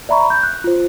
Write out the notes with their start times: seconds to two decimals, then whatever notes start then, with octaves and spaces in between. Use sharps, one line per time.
0.09 D5 E5 A#5 B5 C#6
0.30 G6
0.43 F#6
0.64 F4 C5